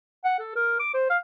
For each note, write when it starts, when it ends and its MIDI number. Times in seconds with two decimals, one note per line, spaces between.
0.25 0.39 78
0.39 0.51 69
0.56 0.75 70
0.79 0.92 86
0.94 1.06 72
1.10 1.17 77